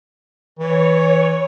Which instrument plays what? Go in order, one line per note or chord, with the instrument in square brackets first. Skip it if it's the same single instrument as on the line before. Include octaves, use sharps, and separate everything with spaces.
[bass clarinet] E3 [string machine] C#5